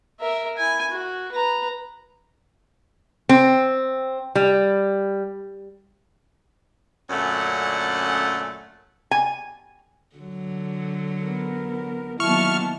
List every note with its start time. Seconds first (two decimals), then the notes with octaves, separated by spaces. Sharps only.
0.20 A#4 E5
0.57 E4 G#5
0.90 F#4
1.32 B4 A#5
3.29 C4
4.35 G3
7.09 F#2 A#2 D3 A3 C#4 F#5
9.11 G#5
10.16 D3 F#3
11.23 B3 A#4
12.20 D#3 F#3 A#3 B3 E4 A5 C#6 F6